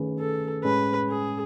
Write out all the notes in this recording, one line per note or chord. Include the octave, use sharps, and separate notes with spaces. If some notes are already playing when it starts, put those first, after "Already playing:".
Already playing: D#3 A3 C#4 G#4 B4
A4
A2 G#3 C#4 G#4 B4
G#4